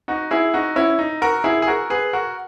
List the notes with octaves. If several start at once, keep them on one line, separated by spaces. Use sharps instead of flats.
D#4 F#4
E4 G#4
D#4 F#4
C#4 E4
D#4
F#4 A#4
E4 G#4
G#4
F#4 A#4
G#4 B4
F#4 A#4